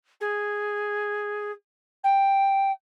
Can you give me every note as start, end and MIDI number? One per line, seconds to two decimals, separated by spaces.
0.20 1.51 68
2.03 2.71 79